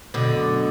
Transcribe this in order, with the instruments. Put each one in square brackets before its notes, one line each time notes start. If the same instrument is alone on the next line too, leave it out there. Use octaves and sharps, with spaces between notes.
[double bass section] F#2 F#3 A3 [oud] B2 D3